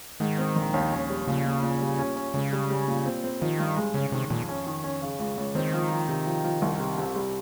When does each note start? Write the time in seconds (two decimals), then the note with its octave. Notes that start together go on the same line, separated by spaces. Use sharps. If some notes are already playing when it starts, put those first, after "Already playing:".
0.20 G#2 D#3
0.38 C4
0.56 A#1
0.74 D#2
0.92 C#4
1.10 G3
1.27 A#2 C#3
1.45 A#2
1.63 A#2
1.81 G3
1.99 C#4
2.16 C#4
2.34 C#2 C#3
2.52 G3
2.70 G3
2.88 A#2
3.06 C4
3.24 C4
3.41 D#3 F3
3.59 G2
3.77 G#3
3.94 C#3 C#4
4.12 C3 D#3
4.30 F2 A#2
4.48 C#4
4.66 D#3
4.84 C#4
5.01 C#3
5.20 C#2
5.38 C#2
5.55 D#3 C4
5.73 F3
5.91 F3
6.08 C3
6.26 F3
6.44 F3
6.62 C2
6.80 C3
6.98 C3
7.16 G3